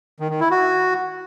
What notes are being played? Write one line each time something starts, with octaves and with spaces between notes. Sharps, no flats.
D#3
D#3
E4
F#4